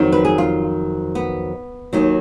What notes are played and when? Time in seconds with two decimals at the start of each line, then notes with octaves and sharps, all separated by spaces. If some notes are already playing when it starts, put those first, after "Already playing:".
Already playing: F2 D#3 F#3
0.12 B4
0.25 G#4
0.38 F4
1.15 B3
1.93 D#2 D#3 F#3